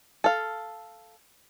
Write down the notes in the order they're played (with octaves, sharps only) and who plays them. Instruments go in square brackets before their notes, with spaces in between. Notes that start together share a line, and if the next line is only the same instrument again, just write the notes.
[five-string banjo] A4 F5